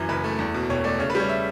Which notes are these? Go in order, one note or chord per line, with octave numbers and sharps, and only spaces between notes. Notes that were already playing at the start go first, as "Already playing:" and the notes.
Already playing: F#2 E3
F#1 B4
A3
E2
B2
E1 C#5
A3 D5
C#3 C#5
B4
G3 C#5
E5